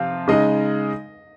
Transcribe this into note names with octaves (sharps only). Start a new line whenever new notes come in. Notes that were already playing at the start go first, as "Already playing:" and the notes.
Already playing: C3 F3 C4 F4 F5
C#3 G#3 D#4 D#5